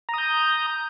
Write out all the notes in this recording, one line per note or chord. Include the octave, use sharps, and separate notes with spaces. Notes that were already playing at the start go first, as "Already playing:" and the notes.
A#5 D#6 G6